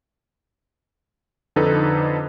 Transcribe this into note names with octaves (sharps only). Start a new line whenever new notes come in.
F2 D3 D#4 A4 B4